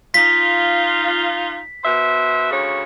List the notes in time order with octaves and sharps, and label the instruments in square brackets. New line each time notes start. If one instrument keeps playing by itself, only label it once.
[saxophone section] D#4 F4 [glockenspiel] B6
[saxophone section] B2 C5 E5
D2 C#3 C#5